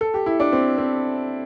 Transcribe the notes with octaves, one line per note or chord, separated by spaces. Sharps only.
A4
G4
E4
D4
C4
C4